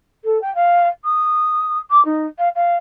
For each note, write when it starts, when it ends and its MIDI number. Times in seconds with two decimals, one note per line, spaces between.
0.24 0.38 69
0.41 0.53 79
0.54 0.87 77
1.04 1.79 87
1.90 2.03 86
2.05 2.26 63
2.38 2.48 77
2.55 2.76 77